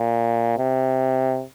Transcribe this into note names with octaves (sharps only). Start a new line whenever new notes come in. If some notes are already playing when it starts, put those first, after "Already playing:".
Already playing: A#2
C3